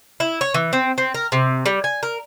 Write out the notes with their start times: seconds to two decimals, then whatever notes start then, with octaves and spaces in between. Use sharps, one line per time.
0.20 E4
0.41 C#5
0.54 E3
0.73 C4
0.98 C4
1.14 A#4
1.32 C3
1.66 G3
1.84 G#5
2.03 A#4